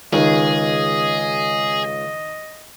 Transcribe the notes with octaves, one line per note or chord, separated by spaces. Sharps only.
C#2 D#3 G#4 D#5